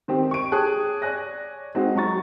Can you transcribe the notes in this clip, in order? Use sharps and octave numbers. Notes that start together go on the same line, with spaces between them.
D#3 C4 G4
C#6 D7
G4 G#4 C#5 A5 F#6
C#5 D5 G#5 F#6 A#6
G#3 C4 D#4 F#4
F#3 A#5 C#6 A6